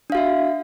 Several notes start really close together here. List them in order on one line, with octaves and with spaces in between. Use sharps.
D4 F5 F#4 E5